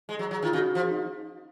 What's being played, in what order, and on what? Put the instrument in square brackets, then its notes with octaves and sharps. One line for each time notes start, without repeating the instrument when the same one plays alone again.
[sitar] G#3
F#3
F#3
[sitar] D#3 [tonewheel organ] F4
[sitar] C#3 [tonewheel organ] F#4
[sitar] F3
[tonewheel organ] D#4